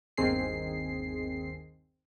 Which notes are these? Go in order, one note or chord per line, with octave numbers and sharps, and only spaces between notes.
G1 D#2 D#3 C4 G#4 C7